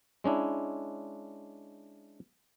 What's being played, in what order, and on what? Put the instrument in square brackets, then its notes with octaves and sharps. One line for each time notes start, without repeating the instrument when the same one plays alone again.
[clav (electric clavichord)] G#3 C#4 D4 E4